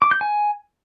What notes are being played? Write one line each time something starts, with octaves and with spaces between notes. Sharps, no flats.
D6
G6
G#5